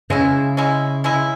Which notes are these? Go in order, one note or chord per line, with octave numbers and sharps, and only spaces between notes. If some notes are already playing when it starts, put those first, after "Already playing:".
C#3 G#3 C#4 E4
G#3 C#4 E4
G#3 C#4 E4